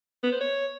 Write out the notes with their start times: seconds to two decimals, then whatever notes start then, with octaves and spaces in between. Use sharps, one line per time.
0.23 B3
0.32 C5
0.41 C#5